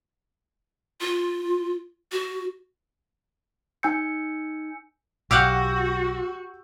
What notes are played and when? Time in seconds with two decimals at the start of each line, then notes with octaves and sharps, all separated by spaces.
1.01 F4
2.12 F#4
3.83 D#4 G#5 E6 G6 C#7
5.31 B1 F#4 G4 F5 F#5 E6 G6